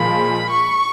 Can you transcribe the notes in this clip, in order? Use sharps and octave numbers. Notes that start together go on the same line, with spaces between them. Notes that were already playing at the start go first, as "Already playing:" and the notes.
Already playing: A#2 F3 G#3 B5
C#6